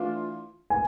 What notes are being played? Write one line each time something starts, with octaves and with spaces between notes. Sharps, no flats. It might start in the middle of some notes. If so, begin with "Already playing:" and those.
Already playing: E3 A3 D4 F4
G#5